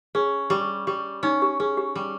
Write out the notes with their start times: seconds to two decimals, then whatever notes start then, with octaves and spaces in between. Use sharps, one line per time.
0.15 C#4 G#4
0.50 G3 G4
0.87 G3 G4
1.23 C#4 D#4
1.42 G4
1.60 C#4 G#4
1.77 G4
1.95 G3